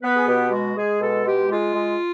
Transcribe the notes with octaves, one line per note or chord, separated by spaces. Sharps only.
B3 B4
G#4
B2 G4
G#3 F#4
G#3 G#4
B2 A4
G#3 G4
G#3 F4
G#3